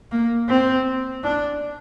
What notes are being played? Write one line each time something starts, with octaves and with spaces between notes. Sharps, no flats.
A#3
C4
D4